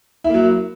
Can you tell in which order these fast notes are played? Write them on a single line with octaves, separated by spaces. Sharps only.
E4 A#3 F#3